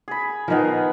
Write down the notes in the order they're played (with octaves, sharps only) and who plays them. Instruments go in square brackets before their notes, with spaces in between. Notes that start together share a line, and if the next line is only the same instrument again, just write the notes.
[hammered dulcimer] G#4 B5
[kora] D#3 F3 [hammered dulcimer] B3 G#4 A#4